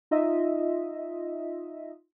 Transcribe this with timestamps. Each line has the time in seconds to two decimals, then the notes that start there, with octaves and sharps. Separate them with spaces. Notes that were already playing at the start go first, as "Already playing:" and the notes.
0.11 D#4 F4 D#5 E5